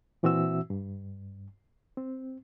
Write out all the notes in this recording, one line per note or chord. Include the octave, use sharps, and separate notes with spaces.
A#2 E3 C4 F#4 E5 E6
G2
C4